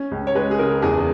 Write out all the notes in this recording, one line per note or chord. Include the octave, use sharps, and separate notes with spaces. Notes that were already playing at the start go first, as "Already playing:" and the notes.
Already playing: C#4
C#2
C#5
G#3 B4
G#4
C#3 A#4
E2 G#4